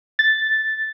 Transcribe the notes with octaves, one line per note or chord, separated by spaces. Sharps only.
A6